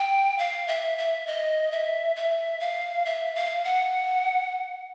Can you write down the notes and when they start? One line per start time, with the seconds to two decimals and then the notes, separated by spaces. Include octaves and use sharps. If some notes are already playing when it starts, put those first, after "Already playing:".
Already playing: G5
0.39 F5
0.68 E5
0.98 E5
1.27 D#5
1.72 E5
2.16 E5
2.60 F5
3.05 E5
3.35 F5
3.65 F#5